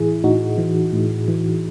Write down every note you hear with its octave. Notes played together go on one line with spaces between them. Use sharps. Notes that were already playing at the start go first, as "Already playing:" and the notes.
Already playing: A2 E3 E4 G#4
A2 D#4 F#4
E3
A2
E3